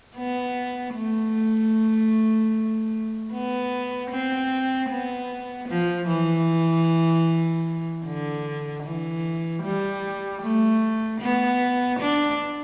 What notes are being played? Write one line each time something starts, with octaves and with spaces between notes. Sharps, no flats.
B3
A3
B3
C4
B3
F3
E3
D3
E3
G3
A3
B3
D4